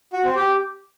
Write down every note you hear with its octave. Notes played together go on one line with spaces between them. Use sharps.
F#4
C4
G4